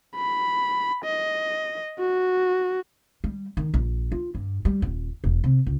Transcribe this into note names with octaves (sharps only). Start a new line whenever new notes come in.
B5
D#5
F#4
G3
D#3
A#1
F4
G2
G3
D#1
E1
C3
C#2